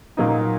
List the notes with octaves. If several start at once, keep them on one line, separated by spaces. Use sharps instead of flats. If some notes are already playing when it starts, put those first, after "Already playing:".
A#2 F#3 A#3 D#4